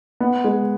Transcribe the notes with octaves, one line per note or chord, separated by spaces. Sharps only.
B3
G#3